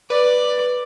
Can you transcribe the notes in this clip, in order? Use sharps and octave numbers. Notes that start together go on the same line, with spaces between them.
B4 D5